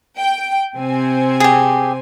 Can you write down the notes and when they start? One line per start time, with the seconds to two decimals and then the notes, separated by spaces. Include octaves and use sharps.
0.18 G5
0.76 C3 C4 G#5
1.40 G4 G#4